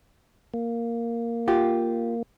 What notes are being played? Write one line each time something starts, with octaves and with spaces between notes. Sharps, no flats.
A#3
F4 G4